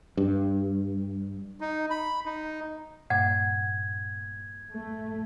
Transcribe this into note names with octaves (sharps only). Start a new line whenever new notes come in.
G2
D#4
B5
D#4
G2 A#2 F#5 G#6
A3